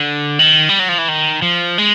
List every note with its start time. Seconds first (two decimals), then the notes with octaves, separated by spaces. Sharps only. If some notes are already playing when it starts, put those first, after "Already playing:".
Already playing: D3
0.39 D#3
0.69 G3
0.79 F#3
0.89 F3
0.98 E3
1.08 D#3
1.42 F3
1.78 G#3